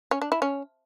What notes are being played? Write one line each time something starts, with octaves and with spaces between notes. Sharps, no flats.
C#4
D4
E4
C#4